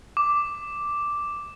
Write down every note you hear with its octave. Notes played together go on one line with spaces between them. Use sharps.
D6